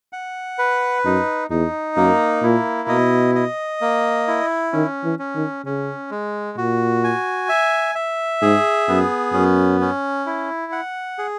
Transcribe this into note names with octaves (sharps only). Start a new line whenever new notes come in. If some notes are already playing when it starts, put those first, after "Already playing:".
F#5
B4
F#2 D#4
E2 D#4
F#2 A#3
A#2 E4
B2 D#5
D#5
A#3
E4
D#3 C#4
E3
C#4
D#3
C#3 C#4
G#3
A#2 F#4
G#5
E5
E5
G#2 G#4
F#2 B3
F#2 C#4
C#4
E4
F#5
G#4